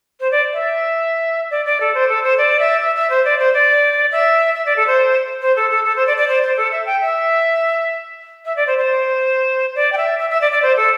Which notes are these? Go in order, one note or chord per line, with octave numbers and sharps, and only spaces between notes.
C5
D5
E5
D5
D5
A4
C5
A4
C5
D5
E5
E5
E5
C5
D5
C5
D5
E5
E5
D5
A4
C5
C5
A4
A4
A4
C5
D5
D5
C5
C5
A4
E5
G5
E5
E5
D5
C5
C5
D5
G5
E5
E5
E5
D5
D5
C5
A4